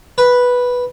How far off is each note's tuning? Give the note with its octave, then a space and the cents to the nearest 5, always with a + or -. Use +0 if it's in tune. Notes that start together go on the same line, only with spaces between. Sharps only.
B4 -5